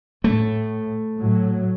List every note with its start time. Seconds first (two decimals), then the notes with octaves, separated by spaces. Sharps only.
0.24 A2 A3
1.17 A2 F#3